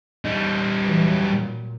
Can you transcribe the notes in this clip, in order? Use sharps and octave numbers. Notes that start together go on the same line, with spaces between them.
G3 D#4
E3 F#3
A#2